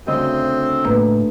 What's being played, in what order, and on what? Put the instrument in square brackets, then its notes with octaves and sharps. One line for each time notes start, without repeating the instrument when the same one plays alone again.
[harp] D2 C#3 D#5 [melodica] C4
[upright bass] A2 [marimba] A#3 B4